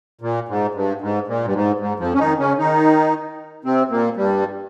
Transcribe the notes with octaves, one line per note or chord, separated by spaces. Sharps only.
A#2
G#2
G2
G#2
A#2
G2
G#2
G#2
F2 F3
C#4
D#3 D#4
C#3 C#4
D#3 D#4
C3 C4
A#2 A#3
G2 G3